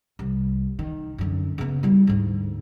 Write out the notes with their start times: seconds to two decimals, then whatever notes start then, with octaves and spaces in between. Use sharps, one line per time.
0.19 C2
0.79 D#3
1.18 F#2 D3
1.58 C#3 B3
1.83 G3 E4
2.07 D2 G#2